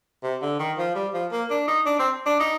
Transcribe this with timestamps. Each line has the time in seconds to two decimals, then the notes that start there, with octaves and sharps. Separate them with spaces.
0.23 C3
0.42 D3
0.59 D#3
0.78 F3
0.95 G3
1.14 F3
1.32 A#3
1.50 D4
1.68 D#4
1.86 D4
1.99 C4
2.26 D4
2.40 D#4